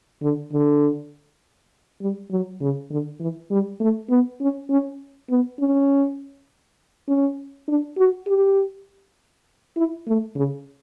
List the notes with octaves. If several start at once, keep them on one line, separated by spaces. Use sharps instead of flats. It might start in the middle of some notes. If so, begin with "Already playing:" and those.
D3
D3
G3
F#3
C#3
D3
E3
G3
A3
B3
C#4
C#4
B3
C#4
C#4
D4
F#4
G4
E4
A3
C#3